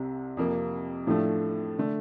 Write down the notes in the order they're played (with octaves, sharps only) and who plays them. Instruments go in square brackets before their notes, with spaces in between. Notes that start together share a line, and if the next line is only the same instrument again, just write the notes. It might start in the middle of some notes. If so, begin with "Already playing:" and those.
Already playing: [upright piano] C2 C3
F2 C3 F3 A#3
A2 F3 A3 D4
D3 A3